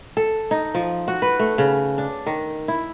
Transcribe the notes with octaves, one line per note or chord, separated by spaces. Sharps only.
A4
D#4
F3
F#4
B4
A3
C#3
D4
D#3
E4